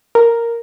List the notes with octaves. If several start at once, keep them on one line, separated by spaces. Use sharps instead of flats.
A#4